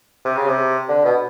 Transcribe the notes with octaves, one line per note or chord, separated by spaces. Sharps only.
C3
C#3
C3
D3
B2